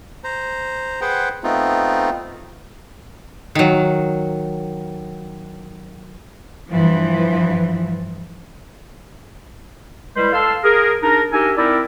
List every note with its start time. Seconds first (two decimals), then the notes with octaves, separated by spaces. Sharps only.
0.24 C5 A#5
1.01 G#4 B4 C5 F#5 G5
1.43 A3 B3 C4 D#4 F4
3.55 D#3 F#3
6.72 G2 E3 F3
10.17 G3 G#3 E4 B4 C5
10.33 A4 F5 A5 C6 E6
10.64 G#4 A#4
11.03 D4 D#4 G#4 A#4 A#5
11.33 D4 D#4 G4 A#4 E5 G#5
11.57 C4 D#4 E4 A#4 D5 E5